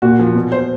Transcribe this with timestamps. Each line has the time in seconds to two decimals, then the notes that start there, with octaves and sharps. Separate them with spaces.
0.02 A#2 F#4
0.19 F3
0.35 B2
0.52 C5